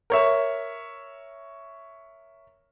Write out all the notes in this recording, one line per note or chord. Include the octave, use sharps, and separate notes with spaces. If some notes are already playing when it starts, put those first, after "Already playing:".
A#4 C#5 E5